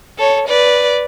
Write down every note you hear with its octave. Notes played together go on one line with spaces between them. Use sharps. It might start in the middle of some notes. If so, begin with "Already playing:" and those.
A4 C#5
B4 D5